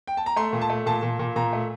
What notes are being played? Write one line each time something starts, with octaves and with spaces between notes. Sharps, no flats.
G5
A5
A#5
A3 C6
A#2
A5
A3
A#2 A5
A#2
A#2
A#2 A#5
A3